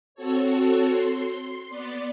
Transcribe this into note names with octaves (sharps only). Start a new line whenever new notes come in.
C4 F#4 A4 C#5
C6
B3 D5 A6